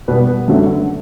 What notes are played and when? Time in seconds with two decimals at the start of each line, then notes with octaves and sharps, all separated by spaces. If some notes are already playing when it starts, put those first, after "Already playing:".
0.08 B2 G3 B3 B4
0.48 F#2 D3 F#3 A3